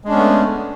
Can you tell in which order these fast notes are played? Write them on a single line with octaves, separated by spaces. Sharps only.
G#3 D4 C#4 B3 A3